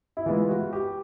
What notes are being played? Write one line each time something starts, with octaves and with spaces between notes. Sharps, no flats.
E4
E3 G#3 B3 F4
F#4
G4